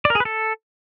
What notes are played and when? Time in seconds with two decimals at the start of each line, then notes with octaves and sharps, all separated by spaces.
0.05 D5
0.10 A#4
0.15 G#4
0.20 B4
0.25 A4